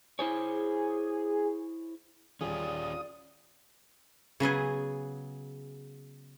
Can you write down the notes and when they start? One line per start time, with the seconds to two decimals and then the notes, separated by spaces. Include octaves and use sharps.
0.19 E4 G#4 C5 C#5
2.41 D#1 C#4 F4 G4 G#4 D5 D#6
4.40 C#3 F#3 B3 G#4